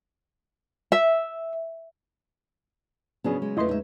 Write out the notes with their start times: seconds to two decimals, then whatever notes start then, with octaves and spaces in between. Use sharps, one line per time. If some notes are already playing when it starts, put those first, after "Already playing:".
0.92 E5
3.24 C#3 F#3 B3 C#4 D4 G#4
3.42 G#3
3.57 E2 A3 E4 F4 B4 D#5 C6
3.69 G#3 D#4 E5